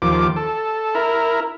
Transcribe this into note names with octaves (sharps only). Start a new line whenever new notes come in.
D#2 F3 D6
A4
E4 A#4